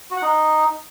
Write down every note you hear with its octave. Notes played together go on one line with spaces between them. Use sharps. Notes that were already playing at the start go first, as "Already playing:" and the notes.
F#4
F#5
D#4